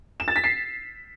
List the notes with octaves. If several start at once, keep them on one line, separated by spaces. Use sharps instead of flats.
E7
A6
B6
C7